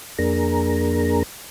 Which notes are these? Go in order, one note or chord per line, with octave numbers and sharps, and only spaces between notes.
F2 A#3 D4 G#4 A#4 A#5